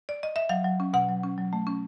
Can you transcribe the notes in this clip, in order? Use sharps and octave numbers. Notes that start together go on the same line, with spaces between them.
D5
D#5
E5
F#3 F5
F#3
C#4
B2 F#5
F#3
C#4
F#3
A3
C#4